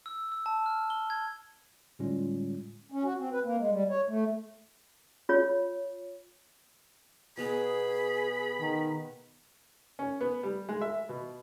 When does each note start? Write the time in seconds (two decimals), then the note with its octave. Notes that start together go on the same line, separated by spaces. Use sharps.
0.06 E6
0.32 E6
0.46 A5
0.66 F6
0.90 G7
1.10 G#6
1.99 A2 D3 G3 G#3 C#4 F4
2.92 C#4
3.04 F#4
3.18 C4
3.32 B4
3.44 A#3
3.58 G#3
3.71 G3
3.90 C#5
4.08 A3
5.29 F4 C#5
7.37 B2 B3 G#4 A#5 B5
8.61 D#3
9.99 C#4
10.21 B3
10.43 G3
10.69 G#3
10.81 E5
11.09 B2